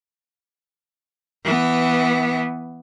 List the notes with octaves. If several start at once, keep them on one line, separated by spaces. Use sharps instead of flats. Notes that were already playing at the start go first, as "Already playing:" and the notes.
E3 B3